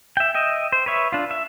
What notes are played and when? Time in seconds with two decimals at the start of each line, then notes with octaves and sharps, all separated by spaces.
0.17 E5 G5
0.34 D#5 E5 G5
0.72 C5
0.86 B4 C#5 E5
1.12 D4 F4
1.31 E5